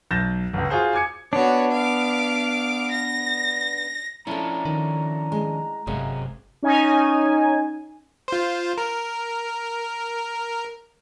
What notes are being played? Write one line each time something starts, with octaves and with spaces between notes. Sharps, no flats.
B1 G6 A6 A#6 E7
G1 C#2
F4 F#4 G#4 C5
G#5 D6 G#6 C#7
B3 D4 F#4 C#5
F5 D6
A#6
F3 C#4 D4 E4 A4 A#5
D#3
G#3
G1 F#2 C3 G#3 C4 G#4
C#4 D#4 G#5
F4 C5
A#4